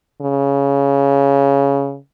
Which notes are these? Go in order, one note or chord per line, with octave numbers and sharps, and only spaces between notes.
C#3